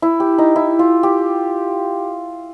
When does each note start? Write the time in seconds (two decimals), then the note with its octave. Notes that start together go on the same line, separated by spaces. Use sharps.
0.02 E4
0.20 G4
0.38 D#4
0.56 E4
0.79 F4
1.03 G4